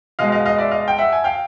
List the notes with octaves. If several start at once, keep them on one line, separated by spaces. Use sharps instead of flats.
B2 G#3 D#5 F5
D#5 F5
D#5 F5
D5 E5
D#5 F5
G5
E5 F#5
G#5
F5 G5